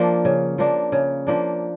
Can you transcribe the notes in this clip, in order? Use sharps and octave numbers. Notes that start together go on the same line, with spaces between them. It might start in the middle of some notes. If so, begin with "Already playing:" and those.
Already playing: F3 A#3 D4
C#3
F3 A#3 D4
C#3
F3 A#3 D4